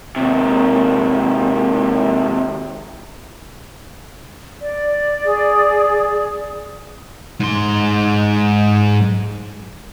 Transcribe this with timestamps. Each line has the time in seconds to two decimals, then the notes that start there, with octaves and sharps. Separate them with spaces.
0.16 D#2 C3
4.62 D5
5.25 G#4
7.40 G#2 C6